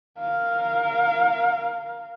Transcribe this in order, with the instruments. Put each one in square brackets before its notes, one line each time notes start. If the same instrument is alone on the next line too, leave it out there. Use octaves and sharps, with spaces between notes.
[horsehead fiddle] A#4 F5